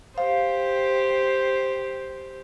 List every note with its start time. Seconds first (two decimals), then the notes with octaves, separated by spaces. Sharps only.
0.18 G4 C5 F5